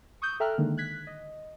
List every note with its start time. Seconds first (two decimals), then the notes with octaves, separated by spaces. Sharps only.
0.22 C#6 D#6 E6 G6
0.40 A4 E5 G5 A#5 F6 F#6
0.58 D3 D#3 G#3 A#3
0.77 F#6 G#6 B6
1.07 D#5